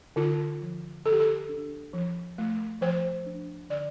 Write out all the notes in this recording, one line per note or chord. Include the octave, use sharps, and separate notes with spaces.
D3 F4
F3
D3 A4
G4
A4
D4
F3
A3
F3 C5
D4
D3 D5